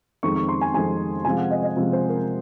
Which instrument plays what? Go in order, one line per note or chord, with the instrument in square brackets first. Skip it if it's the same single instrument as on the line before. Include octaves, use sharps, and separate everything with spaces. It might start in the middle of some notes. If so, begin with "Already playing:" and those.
[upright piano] F2 D#3 G#3 C4 C#6
C#6
C6
G#5
F2 D#3 G#3 C4 G#5
C3 F3 G#3 C4 F4 G#5
F#5
D#5
D#5
C3 F3 G#3 C4 F4
C5
A#4